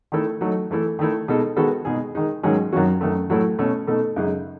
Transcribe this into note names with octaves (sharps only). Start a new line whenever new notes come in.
D#3 A3 E4 A4
F#3 A3 D#4
E3 A3 E4 A4
D#3 A3 E4
B2 G#3 D#4 A4
D#3 G#3 B3 F#4 A4
B2 G#3 D#4 G#4
D#3 G#3 D#4
G#2 D#3 F#3 C#4 G#4
F#2 D#3 F#3 C#4 F#4
F#2 D#3 A3
A2 F#3 A3 E4 A4
B2 A3 C#4
B2 A3 D#4 A4
F#2 C#3 G#3 D#4